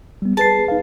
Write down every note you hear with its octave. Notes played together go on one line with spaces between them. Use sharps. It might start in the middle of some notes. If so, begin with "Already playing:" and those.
G3 B3
G#4 B4 A5 C7
D#4 B4 F5